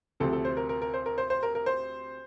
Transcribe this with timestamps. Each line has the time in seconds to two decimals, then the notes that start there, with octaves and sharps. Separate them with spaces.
0.20 D2 C3 F3 C4 A4
0.33 A4
0.45 C5
0.57 A#4
0.69 A#4
0.82 A#4
0.94 C5
1.06 A#4
1.18 C5
1.30 C5
1.43 A#4
1.55 A#4
1.66 C5